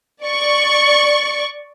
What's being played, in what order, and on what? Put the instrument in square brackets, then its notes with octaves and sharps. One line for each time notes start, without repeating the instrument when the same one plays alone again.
[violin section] D5 C#6